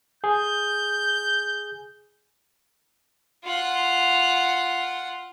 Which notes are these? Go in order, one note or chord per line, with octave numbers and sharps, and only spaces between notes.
G#4 G6
F4 F#5